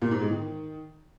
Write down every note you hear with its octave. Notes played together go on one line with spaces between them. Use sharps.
A#2
G#2
G#3
D#3